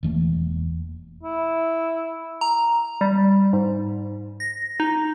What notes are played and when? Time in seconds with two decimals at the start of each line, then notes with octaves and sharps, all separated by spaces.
0.03 E1 E3 A3 A#3
1.23 E4
2.41 A#5
3.01 G3
3.53 G#2
4.40 A#6
4.80 D#4